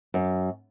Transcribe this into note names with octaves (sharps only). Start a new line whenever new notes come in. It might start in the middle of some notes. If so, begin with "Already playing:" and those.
F#2